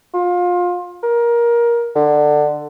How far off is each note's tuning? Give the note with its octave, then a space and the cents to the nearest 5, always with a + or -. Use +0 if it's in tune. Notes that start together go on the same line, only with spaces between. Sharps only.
F4 +25
A#4 +20
D3 +20